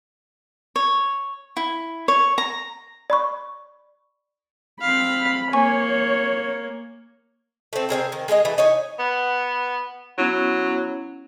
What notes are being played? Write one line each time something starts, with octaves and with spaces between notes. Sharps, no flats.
C#5
E4
C#5
A#5
D5 B5 C#6
C4 F5 B5
A#3 C#5 G#5 C#6
A3 C4
C4 C#4 G#4 A#4
D#3
G#3 G#4 A#4 D#5
E3 A3
D#4 C#5 G#5
B3
F#3 B3 C#4 E4